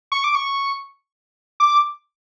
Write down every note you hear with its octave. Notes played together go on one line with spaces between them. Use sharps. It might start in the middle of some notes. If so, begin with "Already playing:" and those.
C#6
D6
C#6
D6